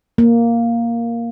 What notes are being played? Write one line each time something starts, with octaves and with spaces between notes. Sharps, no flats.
A#3